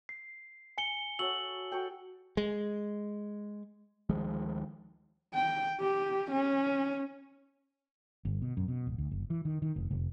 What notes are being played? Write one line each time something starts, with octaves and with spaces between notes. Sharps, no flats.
C7
G#5 C#7 G7
F#4 A4 C#5 E6 F#7
F#4 A4 G5
G#3
D2 D#3 F3 G#3
G5
G4
C#4
G1
B2
F#2
B2
D1
D2
F#1
E3
D#3
D#3
F1
F1